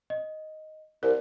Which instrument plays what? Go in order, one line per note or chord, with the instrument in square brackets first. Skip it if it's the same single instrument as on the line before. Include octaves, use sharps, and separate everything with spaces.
[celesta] D#5
[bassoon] C2 [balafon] A#4